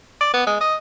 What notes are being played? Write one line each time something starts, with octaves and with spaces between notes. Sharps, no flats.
D5
B3
G#3
D#5